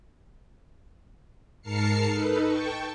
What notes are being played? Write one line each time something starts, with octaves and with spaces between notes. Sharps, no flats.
G#2 A#4 A5 F6 C7 C#7
D#4 A4 B4
G5 A5 C#6